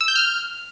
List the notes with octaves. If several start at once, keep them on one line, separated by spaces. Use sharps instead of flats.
E6
G6
F6